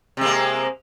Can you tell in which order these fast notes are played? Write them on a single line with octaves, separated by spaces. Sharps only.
C3 G#3 A#3